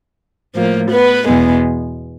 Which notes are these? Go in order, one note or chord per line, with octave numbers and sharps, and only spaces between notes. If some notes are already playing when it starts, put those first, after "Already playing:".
A2 F3 A#3
B3 B4
E2 B2 G#3 B3